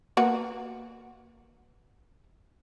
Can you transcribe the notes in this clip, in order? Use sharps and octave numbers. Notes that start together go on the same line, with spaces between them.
A#3 F#4 B4